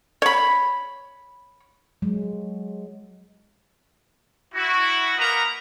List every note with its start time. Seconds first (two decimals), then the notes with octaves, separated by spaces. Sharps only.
0.22 C#5 B5
2.02 F#3 G#3
4.54 E4 F#4
5.17 A#3 A#4 B4 D#5 F#5 A#5